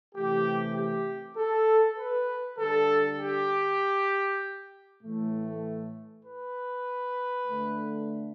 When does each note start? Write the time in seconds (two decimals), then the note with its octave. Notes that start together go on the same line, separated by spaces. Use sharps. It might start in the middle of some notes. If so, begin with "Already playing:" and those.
0.14 C3 E3 A3 G4
0.75 G4
1.37 A4
1.98 B4
2.58 D3 G3 A4
3.19 G4
5.01 A2 E3 A3
6.24 B4
7.46 D3 A3